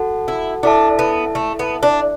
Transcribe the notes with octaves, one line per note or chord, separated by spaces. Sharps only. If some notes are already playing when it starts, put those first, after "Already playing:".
Already playing: F#4 A4 F#5 A5
E4
D4 E4 A4 E5 A5
B3
A3
B3
D4